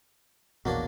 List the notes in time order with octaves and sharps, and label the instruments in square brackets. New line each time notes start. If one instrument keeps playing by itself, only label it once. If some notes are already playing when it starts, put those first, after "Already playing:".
[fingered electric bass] A#1 E2 B2 [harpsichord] F#3 A#3 D4